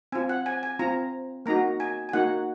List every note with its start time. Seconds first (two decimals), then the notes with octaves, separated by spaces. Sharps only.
0.12 C4 F4 G#5
0.29 F#5
0.46 G#5
0.63 G#5
0.79 C4 F4 A#5
1.46 A#3 D#4 F#4 A#5
1.80 G#5
2.09 G#5
2.13 A#3 D#4 F#4 F#5